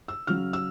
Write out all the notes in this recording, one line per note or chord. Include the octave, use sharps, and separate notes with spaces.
E6
C#3 F#3 F6
E6